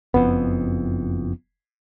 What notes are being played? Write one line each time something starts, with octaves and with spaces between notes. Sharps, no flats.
F#1 F2 B3